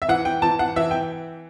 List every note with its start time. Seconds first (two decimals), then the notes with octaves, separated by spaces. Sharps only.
0.02 E5
0.08 E3 F#5
0.25 G5
0.42 E3 A5
0.59 F#5
0.76 E3 E5
0.91 G5